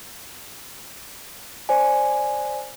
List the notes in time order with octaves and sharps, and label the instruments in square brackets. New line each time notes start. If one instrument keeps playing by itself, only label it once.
[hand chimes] C5 D5 G#5